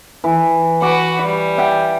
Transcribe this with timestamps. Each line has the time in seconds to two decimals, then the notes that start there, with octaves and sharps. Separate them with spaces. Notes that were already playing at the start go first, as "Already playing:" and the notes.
0.24 E3
0.82 F#4 B4 D6
1.23 G3
1.58 E5 F#5 G5